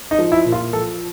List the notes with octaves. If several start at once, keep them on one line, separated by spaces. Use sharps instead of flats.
D#4
F3
E4
A#2
F4
F3 A4